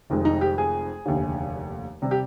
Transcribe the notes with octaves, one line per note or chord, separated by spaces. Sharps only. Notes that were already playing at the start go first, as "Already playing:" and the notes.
F1 F2 D#3 G#3
D#4
G4
G#4
F1 D#2 D3
C3 G3
G4